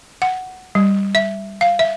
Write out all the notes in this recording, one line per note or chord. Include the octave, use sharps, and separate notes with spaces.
F#5
G3
E5
F5
E5